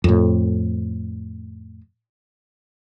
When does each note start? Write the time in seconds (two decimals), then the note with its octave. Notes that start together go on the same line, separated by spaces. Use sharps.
0.04 F2 A2